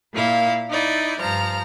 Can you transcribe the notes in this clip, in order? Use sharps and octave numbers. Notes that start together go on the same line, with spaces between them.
A#2 A#3 E4 F5
D#4 E4 D5
G2 F3 A#5 F6